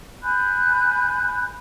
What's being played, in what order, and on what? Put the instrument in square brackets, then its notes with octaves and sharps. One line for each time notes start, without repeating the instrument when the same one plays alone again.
[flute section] G#5 B5 F#6 G6